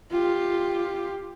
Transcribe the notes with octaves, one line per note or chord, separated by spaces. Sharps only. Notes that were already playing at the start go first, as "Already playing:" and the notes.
F4 G4